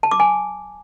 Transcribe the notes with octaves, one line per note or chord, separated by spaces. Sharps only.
A5
D6
G#5